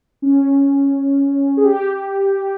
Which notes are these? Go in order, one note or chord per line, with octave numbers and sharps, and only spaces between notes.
C#4
G#4
G4